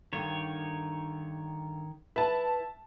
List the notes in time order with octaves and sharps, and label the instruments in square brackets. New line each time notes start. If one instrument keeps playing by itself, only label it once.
[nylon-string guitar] G2 D3 [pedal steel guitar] D#3 C#5
[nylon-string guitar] E4 B4 [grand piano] E5 A5